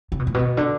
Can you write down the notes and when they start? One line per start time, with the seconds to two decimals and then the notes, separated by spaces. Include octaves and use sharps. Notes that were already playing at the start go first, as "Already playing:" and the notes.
0.12 C#3
0.19 B2
0.27 A2
0.34 B2
0.57 D3